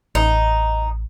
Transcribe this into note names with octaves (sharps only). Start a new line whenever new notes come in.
A1 D#4